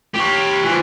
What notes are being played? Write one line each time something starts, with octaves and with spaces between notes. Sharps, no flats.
G4 C#5
E3 F3